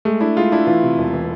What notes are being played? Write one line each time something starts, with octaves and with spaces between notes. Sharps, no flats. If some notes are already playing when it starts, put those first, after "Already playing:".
G#3 A3
D4 E4
G#3 F4
D4 E4
E3 F4
C3
E1
E3